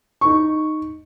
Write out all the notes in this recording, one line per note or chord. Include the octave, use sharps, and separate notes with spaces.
D#4 C#6